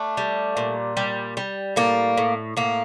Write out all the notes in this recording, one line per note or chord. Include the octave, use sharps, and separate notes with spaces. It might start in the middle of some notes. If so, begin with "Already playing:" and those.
Already playing: A3 D4
G3
A#2
G3
G3
A2 A#3
A2
A2 A#3